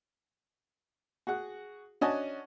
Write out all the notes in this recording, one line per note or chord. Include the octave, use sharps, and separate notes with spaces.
F#4 G#4 F#5
C#4 D4 F#4 D#5 G#5 A5